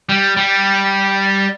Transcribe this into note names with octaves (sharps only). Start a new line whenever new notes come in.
G3
G3